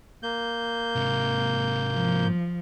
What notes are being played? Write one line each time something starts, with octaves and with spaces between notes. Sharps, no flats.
A#3 G6
G#2 C3
F3